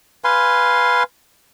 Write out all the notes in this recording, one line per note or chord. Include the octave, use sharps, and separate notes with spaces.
B4 F5 G#5 C6